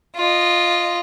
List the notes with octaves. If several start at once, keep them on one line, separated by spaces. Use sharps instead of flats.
F4 D#5